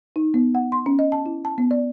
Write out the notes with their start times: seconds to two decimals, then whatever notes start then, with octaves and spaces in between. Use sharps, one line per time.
0.16 D#4
0.34 B3
0.55 F#5
0.72 C6
0.86 C#4
0.99 D#5
1.12 A5
1.26 E4
1.45 A5
1.58 B3
1.71 D5